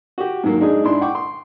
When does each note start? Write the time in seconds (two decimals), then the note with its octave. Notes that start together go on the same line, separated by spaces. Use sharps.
0.18 F#4 G4
0.44 G#2 D#3 F#3 A#3
0.61 G#3 D4 D#4 G#4
0.84 G#2 D4 E4 C6
1.01 F#5 G5 C#6 D6
1.15 C6